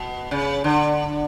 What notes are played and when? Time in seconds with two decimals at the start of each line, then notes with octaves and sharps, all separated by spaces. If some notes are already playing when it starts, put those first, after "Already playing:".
Already playing: B2
0.31 C#3
0.64 D3